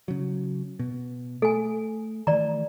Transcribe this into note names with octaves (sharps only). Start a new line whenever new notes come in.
C#3 F#3
B2
A3 A4 G#5
D#3 E3 A3 D5 A#5